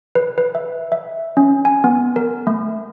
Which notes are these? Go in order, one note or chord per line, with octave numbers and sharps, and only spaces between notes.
B4
B4
E5
E5
C#4
G#5
B3
A#4
A3